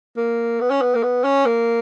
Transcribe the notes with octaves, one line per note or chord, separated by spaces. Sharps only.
A#3
B3
C#4
B3
A#3
B3
C#4
A#3